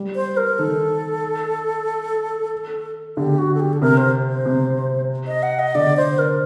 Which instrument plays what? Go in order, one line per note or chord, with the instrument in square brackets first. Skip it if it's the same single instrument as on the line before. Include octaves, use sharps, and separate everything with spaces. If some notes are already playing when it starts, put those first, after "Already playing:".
Already playing: [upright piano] G3
[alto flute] C5
A#4
[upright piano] D#3 [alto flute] A4
[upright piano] D3 [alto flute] G4
[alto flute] F#4
A4
G4
A4
[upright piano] C3 [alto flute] A#4
[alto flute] C5
C5
[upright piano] C3
[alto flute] D#5
F#5
D#5
[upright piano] D3 [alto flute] D5
[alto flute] C5
A#4